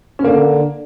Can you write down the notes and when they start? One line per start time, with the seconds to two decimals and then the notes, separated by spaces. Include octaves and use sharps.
0.19 C#4
0.24 D3 A#3